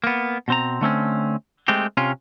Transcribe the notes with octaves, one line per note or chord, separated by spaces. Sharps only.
A#3 B3
B2 C4 A#5
D3 A3 C4 C#4
G#3 A3 C4 G4
C3 C#4 F4